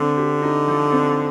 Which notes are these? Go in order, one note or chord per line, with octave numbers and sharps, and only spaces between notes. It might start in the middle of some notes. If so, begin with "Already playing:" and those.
Already playing: D3 C4
G4
D#4
F3
C4